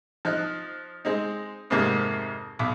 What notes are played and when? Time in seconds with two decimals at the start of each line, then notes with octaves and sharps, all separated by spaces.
0.25 F3 D#4 F#6
1.05 G#3 C4 D#4
1.70 F2 G#2 C3 D#3 A#3 C4
2.59 B1 B5 D6